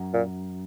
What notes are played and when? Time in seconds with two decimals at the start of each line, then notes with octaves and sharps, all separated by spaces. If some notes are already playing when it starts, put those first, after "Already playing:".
Already playing: F#2
0.13 A#2